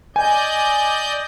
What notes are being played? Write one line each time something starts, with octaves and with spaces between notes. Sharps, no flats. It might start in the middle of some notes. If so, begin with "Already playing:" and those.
D5 D#5 G#5 G6